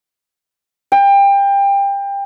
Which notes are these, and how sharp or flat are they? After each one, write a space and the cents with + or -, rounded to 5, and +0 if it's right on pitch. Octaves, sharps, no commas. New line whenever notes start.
G5 +25